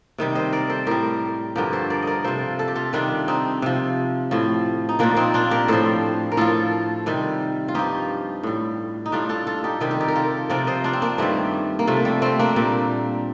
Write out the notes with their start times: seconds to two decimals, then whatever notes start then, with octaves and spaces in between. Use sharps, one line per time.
0.18 C3 D#3 G3
0.35 C5 D#5
0.52 A#4 D5
0.69 A4 C5
0.86 A2 G3 G4 A#4
1.55 G2 D3 F3 G4 A#4
1.73 A4 C5
1.90 A#4 D5
2.03 A#4 D5 D#5
2.24 C3 F3 A4 C5
2.59 A4
2.68 G4
2.76 F4 A4
2.93 C3 D#3 G3 D4 F4
3.28 C4 D#4
3.62 C3 F3
4.31 A2 F3
4.89 D#4
4.99 A#2 F3 A#3 D4
5.17 C4 D#4
5.34 D4 F4
5.51 G4 A#4
5.68 A2 F3 A4 C5
6.32 A#4
6.37 A2 F3 F4 A4
7.06 C3 D#3 G3
7.68 F4
7.75 G2 F3 D#4 G4
8.43 A2 G3
9.06 D#4
9.12 A2 G3 D4 F4
9.29 F4 A4
9.47 F4 A4
9.64 D#4 G4
9.80 C3 D#3 G3 G4
9.91 A4
10.00 D#4 G4
10.08 A#4
10.15 F4 A4
10.50 C3 F3 A#4 D5
10.67 C5 D#5
10.84 D4 F4
10.93 C4
11.02 A#3 D4
11.18 G2 D#3 G3 A3 C4
11.79 A#3
11.87 C3 F3 A3
12.05 G3
12.22 A3 C4
12.39 A#3 D4
12.56 A#2 G3